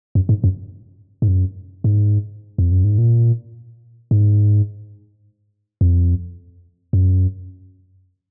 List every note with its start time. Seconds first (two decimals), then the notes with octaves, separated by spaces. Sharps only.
0.15 F#2
0.29 G#2
0.44 F#2
1.22 G#2
1.28 F#2
1.84 G#2
2.58 F2
2.72 F#2
2.84 G#2
2.98 A#2
4.11 G#2
5.81 F2
6.93 F#2